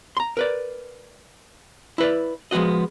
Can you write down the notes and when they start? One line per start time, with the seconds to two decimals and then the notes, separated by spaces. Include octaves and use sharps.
0.17 A#5 C6
0.37 A#4 B4 D5
1.98 E4 B4 D5
2.51 F3 G#3 B3 F#4 D#5